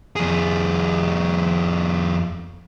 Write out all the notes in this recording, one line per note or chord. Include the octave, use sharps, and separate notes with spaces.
F2 G#4